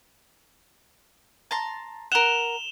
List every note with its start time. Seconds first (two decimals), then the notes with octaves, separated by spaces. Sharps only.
1.51 A5 A#5 C6
2.12 A#4 F#5 E7 F7 G7